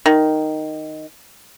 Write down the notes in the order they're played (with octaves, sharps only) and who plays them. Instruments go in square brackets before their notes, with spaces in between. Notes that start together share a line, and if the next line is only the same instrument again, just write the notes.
[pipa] D#3